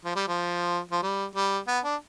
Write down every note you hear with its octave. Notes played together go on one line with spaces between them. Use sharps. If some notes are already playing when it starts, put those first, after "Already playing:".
F3
G3
F3
F3
G3
G3
B3
D4